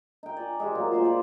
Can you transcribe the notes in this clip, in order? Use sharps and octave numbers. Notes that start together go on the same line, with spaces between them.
D#4 G5
D5 G#5
G#3 G4 C5
A#2 F#3 A#3 D#4
A#2 G#3 C5 C6
F4 D5 F5